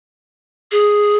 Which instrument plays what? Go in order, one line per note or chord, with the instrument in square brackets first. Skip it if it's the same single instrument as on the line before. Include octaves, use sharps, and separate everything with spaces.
[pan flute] G#4